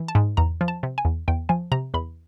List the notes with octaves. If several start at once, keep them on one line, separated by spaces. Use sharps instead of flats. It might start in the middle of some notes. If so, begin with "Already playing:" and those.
Already playing: E3
A5
G#2
E2 A#5
F3
A5
C3
G#5
E2
E2 G5
F3 G#5
C3 A#5
E2 B5